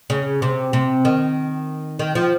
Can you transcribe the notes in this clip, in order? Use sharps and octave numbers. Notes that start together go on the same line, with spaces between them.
C#3
C3
C3
D#3
D#3
F3